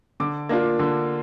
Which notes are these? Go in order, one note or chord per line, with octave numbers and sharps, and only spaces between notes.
D3 D6
A#3 D4 F4
D3